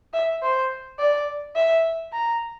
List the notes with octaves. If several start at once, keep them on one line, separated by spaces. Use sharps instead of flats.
E5
C5
D5
E5
A#5